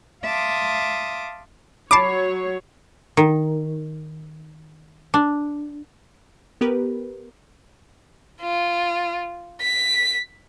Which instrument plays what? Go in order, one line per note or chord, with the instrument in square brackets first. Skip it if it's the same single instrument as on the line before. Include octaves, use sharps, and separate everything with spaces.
[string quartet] E5 F5 A5 C6 D6 D#6
[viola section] F#3 C#5 [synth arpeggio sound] A5 D6 [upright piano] B5 C7
[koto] D#3
D4
[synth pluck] B3 G4 A#4 B4
[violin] F4
B6